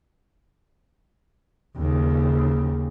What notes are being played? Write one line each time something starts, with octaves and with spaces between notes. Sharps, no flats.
D#2 C#3